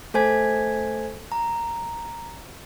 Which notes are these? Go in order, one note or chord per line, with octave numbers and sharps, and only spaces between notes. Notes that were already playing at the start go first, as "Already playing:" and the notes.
A3 A4 C5 G#5 G#6 B6
A#5